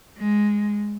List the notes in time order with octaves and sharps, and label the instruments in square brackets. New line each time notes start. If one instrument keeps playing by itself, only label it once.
[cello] G#3